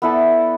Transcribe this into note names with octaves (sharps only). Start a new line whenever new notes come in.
B3 E4 A4 D5